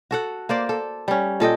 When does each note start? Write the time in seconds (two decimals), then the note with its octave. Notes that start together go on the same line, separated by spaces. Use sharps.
0.11 F#4 A4 F#5
0.49 A#3 C5 D5
0.69 A4
1.08 G3 C#4
1.40 A#2 A4 D#5 G5